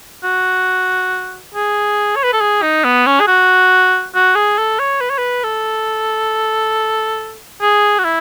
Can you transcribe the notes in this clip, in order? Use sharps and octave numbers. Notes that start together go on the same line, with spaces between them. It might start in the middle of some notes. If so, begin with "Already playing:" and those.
F#4
G#4
C#5
B4
A4
G#4
D#4
B3
C#4
G#4
F#4
F#4
G#4
A4
C#5
B4
C#5
B4
A4
G#4
F#4
E4